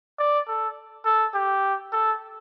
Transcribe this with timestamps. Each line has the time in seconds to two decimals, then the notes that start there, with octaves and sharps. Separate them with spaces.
0.19 D5
0.48 A4
1.05 A4
1.34 G4
1.92 A4